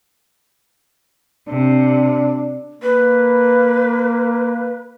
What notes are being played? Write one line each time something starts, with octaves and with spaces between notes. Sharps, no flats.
C3 D4
A#3 B4